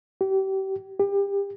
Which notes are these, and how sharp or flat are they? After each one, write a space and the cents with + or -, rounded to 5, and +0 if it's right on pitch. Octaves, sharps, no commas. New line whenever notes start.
G4 -30
G4 +30